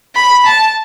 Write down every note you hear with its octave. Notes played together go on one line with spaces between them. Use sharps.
B5
A5